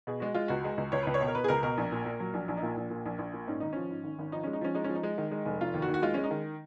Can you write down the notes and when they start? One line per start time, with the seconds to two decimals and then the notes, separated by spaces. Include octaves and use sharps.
0.07 B2 G#4
0.20 G#3 F#4
0.34 G#3 F4
0.48 C#2 F#4
0.64 G#3
0.78 C#2
0.92 C#2 C#5
1.03 C#2 B4
1.14 C#5
1.21 B2
1.28 A#4
1.35 B2 B4
1.44 G#4
1.48 C#2 A#4
1.63 B2 A#4
1.78 A#1
1.92 A#2
2.05 A#2
2.20 F#3
2.34 A#1
2.48 A#1
2.57 D#4
2.63 A#2 F4
2.77 A#1
2.90 A#2
3.06 A#1
3.19 A#1
3.33 A#2
3.48 G#2 C#4
3.60 G#1 D#4
3.73 F3 C#4
3.90 G#2
4.04 G#1
4.19 G#1
4.32 F3 D#4
4.44 G#3 C#4
4.53 D#4
4.61 F3 C#4
4.75 G#3 D#4
4.84 C#4
4.89 F3
4.95 D#4
5.03 G#3
5.18 D#3
5.31 G#3
5.45 F1
5.61 F1 F4
5.74 D#2
5.82 F#4
5.89 D#2
5.94 F#4
6.02 G#3 F4
6.14 G#3 C#4
6.24 D#4
6.31 D#3